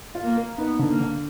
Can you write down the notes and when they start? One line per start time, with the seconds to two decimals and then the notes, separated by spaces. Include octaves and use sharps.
0.15 F4
0.26 A#3
0.36 A#3
0.58 B3 D#4
0.79 D3
0.91 A#3
1.01 D3